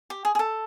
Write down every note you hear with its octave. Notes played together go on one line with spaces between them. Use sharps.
G4
G#4
G#4
A4